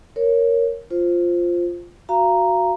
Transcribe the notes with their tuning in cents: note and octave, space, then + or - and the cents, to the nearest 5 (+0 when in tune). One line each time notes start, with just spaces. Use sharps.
A#4 +0 C#5 +0
F4 +0 C5 +0
F#4 +0 F5 -25 A#5 +0